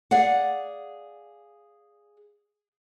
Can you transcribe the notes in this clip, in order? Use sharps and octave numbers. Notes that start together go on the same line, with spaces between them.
G#4 D5 F5 F#5